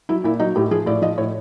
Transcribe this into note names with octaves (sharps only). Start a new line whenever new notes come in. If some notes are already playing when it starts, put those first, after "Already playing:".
F#3 E4
A#2 E4
F#3 D#4
A2 G4
F3 G#4
A2 D5
F3 D#5
A2 C#5